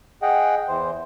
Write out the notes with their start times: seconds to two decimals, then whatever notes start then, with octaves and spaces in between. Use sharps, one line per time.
0.22 G#4 D#5 F#5 G5
0.68 E2 E3 C5